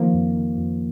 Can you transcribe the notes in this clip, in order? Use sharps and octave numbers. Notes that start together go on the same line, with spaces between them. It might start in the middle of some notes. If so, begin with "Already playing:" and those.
Already playing: D#3 F3 A#3
F2
D#3
F2